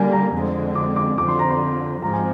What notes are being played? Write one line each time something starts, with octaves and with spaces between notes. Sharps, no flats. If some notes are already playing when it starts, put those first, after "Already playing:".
Already playing: D3 G3 A#3 G#5
A#5
F2 D3 G#3 C4
D6
D6
F2 D3 F3 D6
C6
A#5
C6
G#2 F3 G#3 C4 A#5
G#5